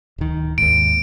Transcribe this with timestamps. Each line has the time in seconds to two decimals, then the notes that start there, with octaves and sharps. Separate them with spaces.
0.18 D1 D#3
0.58 D#2 G#2 D7